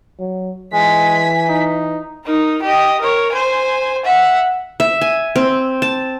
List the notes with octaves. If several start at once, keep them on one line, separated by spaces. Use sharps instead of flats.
F#3
E3 G#3 G#5 B6
D#4
D#4 A#4
G4 D#5
A#4 C#5
C5 G#5
E5 F#5
E5
G#5
C4
A5